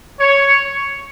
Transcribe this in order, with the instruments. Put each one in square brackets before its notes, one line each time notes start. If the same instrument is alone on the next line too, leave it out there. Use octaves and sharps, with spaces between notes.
[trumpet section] C#5